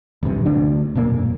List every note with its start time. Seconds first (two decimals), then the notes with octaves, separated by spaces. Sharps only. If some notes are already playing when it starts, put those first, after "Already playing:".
0.23 D1 A#1 G2 C3
0.45 D2 D3 D4
0.95 E1 F#2 A#2 A#3